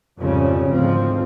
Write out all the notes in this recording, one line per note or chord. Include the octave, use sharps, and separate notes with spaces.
B1 F2 G#2 C#3 G3 C#4
G#1 D2 G#2 F3 C4